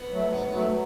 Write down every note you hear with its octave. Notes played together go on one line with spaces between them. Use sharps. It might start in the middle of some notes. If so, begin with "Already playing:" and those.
Already playing: B3
F#3 A3
G#2 B3
B3
F#3 A3